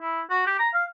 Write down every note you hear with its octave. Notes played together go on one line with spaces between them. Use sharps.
E4
F#4
G4
A#5
F5